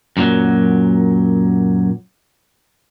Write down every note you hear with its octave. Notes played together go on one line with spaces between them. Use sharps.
F#2 A#2 D#3 F#3